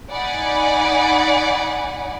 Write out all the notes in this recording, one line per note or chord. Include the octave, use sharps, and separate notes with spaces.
D#4 D5 F#5 G#5 B5